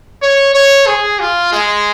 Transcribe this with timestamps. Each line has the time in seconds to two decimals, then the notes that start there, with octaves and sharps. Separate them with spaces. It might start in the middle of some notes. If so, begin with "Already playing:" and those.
0.22 C#5
0.54 C#5
0.87 G#4
1.20 F4
1.52 G#3